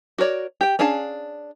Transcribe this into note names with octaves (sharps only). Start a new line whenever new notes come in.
F#4 A#4 C#5 D5
G4 G5
C#4 D4 G#4 F5 A5